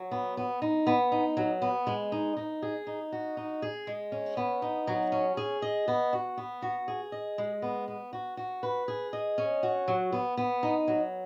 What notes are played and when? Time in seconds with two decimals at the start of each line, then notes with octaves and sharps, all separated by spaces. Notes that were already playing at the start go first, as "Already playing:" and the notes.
Already playing: F#3
0.11 B3
0.37 B3
0.62 D#4
0.87 B3
1.12 D#4
1.37 F#3
1.62 B3
1.87 G#3
2.12 D#4
2.37 D#4
2.62 G#4
2.87 D#4
3.12 F#4
3.37 D#4
3.62 G#4
3.87 G#3
4.12 C#4
4.37 B3
4.62 D#4
4.87 F#3
5.12 C#4
5.37 G#4
5.62 D#5
5.88 B3
6.13 F#4
6.37 B3
6.62 F#4
6.88 G#4
7.12 D#5
7.38 G#3
7.62 B3
7.88 B3
8.13 F#4
8.37 F#4
8.63 B4
8.88 G#4
9.13 D#5
9.38 C#4
9.63 F#4
9.88 F#3
10.12 B3
10.37 B3
10.63 D#4
10.88 F#3